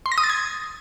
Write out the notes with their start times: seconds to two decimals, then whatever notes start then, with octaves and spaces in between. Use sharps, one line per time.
0.06 C6
0.12 A#6
0.18 D#6
0.24 A6
0.30 G#6